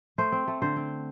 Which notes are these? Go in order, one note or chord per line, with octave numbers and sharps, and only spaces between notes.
A3 C5
C4
A3
D3 C5
C4